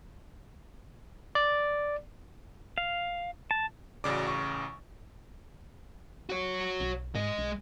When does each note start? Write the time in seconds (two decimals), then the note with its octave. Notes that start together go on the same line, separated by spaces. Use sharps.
1.35 D5
2.78 F5
3.51 A5
4.04 A1 C#3 F#4 D5 D6
4.27 C#6
6.30 F#4 C#5
6.80 B1
7.15 G#2 G#3 D#5
7.38 B1